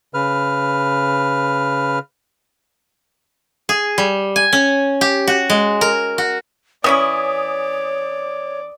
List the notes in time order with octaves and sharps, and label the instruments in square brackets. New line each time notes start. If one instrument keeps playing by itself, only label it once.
[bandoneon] C#3 B4 F6
[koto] G#4
G3
G#5
C#4
G4
F#4
G#3
A#4
F#4
[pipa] E3 C#4 E4 [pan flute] C#5 [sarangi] D5 [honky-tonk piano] D#6